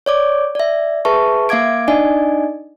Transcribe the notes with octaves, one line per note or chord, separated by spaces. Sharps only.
C#5 D5 D6
D5 E5
G#4 B4 E5 A5 C#6
A#3 E5 F5 D6 G#6 D7
D4 D#4 D5 D#5 G#5